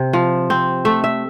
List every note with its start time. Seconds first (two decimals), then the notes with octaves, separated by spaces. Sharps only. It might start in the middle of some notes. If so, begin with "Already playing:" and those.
Already playing: C3
0.13 F3
0.50 C4
0.85 A3 E5
1.04 E5